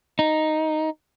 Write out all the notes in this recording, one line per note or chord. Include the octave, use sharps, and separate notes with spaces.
D#4